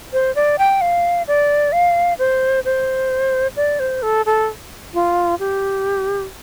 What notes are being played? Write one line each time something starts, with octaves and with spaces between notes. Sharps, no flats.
C5
D5
G5
F5
D5
F5
C5
C5
D5
C5
A4
A4
F4
G4